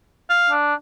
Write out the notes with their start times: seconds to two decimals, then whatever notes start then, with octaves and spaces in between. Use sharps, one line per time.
0.29 F5
0.50 D4